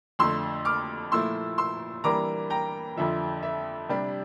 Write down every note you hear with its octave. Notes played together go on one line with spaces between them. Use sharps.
F2 D3 A3 C6 E6
D6 F6
A#2 F3 A3 E4 C6 E6
C6 E6
E3 G3 A#3 D4 A#5 D6
G5 A#5
F2 D3 F3 E5
E5
C3 G3 D4